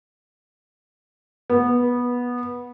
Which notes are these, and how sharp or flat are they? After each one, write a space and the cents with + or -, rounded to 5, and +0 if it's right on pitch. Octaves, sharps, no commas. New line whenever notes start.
B3 -15